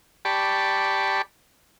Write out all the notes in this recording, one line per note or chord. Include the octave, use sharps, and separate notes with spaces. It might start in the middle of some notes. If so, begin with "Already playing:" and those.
G4 D5 A5 B5 C#6